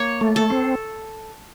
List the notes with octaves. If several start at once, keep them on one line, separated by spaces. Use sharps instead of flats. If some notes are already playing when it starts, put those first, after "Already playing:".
Already playing: A#3 C#5
A3
A4
C4